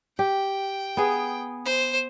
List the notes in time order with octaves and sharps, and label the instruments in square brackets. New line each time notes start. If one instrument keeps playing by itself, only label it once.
[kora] G4 [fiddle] G5
[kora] B3 G#4
[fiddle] C5